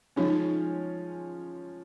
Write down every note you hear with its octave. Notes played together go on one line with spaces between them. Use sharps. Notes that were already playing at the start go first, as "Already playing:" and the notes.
F3 G#3 C#4 D#4